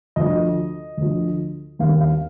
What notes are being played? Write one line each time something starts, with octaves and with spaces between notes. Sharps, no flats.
D2 D3 F3 D#5
D2 D3 F3
D#2 D#3 F5
F5